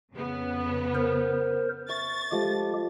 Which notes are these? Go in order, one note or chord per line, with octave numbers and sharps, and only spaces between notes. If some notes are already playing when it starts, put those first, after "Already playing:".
F2 C#3 B3
A#4 C5
E5 C#6 A6
F3 G#3 A3 G4